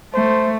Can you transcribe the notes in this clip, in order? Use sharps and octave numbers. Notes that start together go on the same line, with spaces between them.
A3 C5